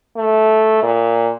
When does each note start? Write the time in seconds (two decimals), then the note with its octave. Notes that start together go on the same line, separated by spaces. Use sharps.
0.17 A3
0.83 A#2